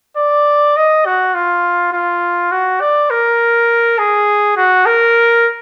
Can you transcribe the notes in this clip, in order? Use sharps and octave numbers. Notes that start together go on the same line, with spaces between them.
D5
D#5
F#4
F4
F4
F#4
D5
A#4
G#4
F#4
A#4